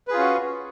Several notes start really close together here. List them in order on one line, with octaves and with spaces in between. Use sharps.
B4 G#4 F4 C#4 F#4